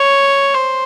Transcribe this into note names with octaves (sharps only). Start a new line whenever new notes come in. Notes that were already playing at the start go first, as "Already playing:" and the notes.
Already playing: C#5
C5